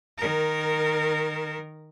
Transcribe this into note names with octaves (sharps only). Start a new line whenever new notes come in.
D#3 A#4